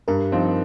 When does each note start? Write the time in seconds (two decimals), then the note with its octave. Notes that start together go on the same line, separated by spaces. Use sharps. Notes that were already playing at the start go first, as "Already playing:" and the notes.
0.08 G2 A#4
0.32 F3 C4 D#4